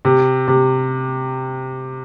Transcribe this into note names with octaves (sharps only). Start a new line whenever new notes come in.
C3
C3